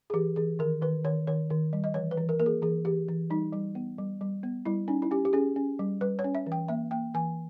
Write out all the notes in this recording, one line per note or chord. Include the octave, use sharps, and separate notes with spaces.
G#4
E3 G4
E3 G#4
D#3 A#4
D#3 B4
D#3 C#5
D#3 C#5
D#3
G3
D#5
E3 C#5
B4
E3
A#4
A#3 A#4
G#4
E3 G#4
E3 G4
E3
G3 D#4
G3
B3
G3
G3
B3
G3 E4
C#4 D#4
E4
C#4 G4
G4
C#4 G#4
C#4
G3
G3 B4
C#5
C#4
E5
E3
G5
A#3 E5
A#3 G5
E3 G#5